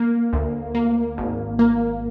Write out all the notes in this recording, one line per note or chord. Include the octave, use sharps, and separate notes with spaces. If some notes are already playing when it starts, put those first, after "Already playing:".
Already playing: A#3
D2
A#3
G#1
A#3